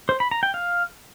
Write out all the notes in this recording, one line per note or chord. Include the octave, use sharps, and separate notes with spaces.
C5
B5
A#5
G5
F5